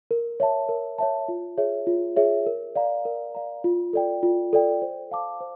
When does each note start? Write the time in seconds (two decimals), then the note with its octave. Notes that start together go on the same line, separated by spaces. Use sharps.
0.11 A#4
0.40 C#5 E5 A5
0.69 A#4
0.98 C#5 E5 A5
1.28 F4
1.57 G#4 C#5 E5
1.87 F4
2.16 G#4 C#5 E5
2.46 A#4
2.76 D5 F5 A#5
3.05 A#4
3.35 D5 F5 A#5
3.64 F4
3.93 A4 D5 G5
4.23 F4
4.53 A4 D5 G5
4.82 C5
5.11 F5 A5 D6
5.41 C5